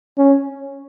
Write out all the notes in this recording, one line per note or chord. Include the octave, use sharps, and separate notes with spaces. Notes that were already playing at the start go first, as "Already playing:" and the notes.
C#4